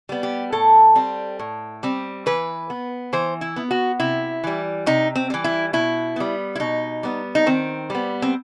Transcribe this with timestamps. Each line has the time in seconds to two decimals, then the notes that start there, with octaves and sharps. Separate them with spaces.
0.09 G3 B3
0.23 G4
0.52 A2 A4
0.95 G3 C4
1.39 A2
1.83 G3 C4
2.26 E3 B4
2.70 B3
3.13 E3 C5
3.41 E4
3.56 B3
3.71 F#4
4.00 C3 E4
4.44 E3 G3
4.86 C3 D#4
5.16 C4
5.30 E3 G3
5.44 E4
5.73 B2 E4
6.16 G3 B3
6.55 E4
6.60 B2 D#4
7.03 G3 B3
7.35 D#4
7.46 D#3 C4
7.90 G3 B3
8.22 C4